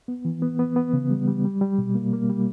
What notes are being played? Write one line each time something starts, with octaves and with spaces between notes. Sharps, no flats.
B3
E3
B3
B3
B3
C#3
G3
G3
G3
G3
B2
A#3
A#3
G3